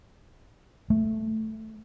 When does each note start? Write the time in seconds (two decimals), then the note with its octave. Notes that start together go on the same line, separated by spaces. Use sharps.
0.90 A3